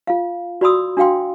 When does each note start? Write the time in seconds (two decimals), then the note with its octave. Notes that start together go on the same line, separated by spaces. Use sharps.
0.07 F4 F5
0.61 F#4 D5 B5 C6 D#6 E6
0.97 D4 F#4 F5 G5 C6